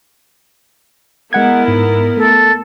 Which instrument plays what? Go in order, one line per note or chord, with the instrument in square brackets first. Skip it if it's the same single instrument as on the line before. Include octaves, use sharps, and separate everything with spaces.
[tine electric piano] G#3 F#5 G#6 [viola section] B3 E4 A#4
[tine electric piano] G#2
[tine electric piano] A3 [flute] A4